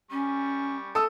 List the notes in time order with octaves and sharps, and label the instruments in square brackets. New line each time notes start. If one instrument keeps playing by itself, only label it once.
[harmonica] G3 C#6 [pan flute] C#4
[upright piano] A4 D#6 E6